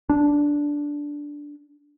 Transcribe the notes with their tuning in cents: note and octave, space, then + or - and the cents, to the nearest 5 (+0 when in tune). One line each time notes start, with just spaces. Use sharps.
D4 -5